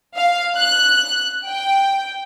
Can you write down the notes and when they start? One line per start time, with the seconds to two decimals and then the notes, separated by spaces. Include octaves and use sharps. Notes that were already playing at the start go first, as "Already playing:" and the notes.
0.16 F5
0.56 F#6
1.46 G5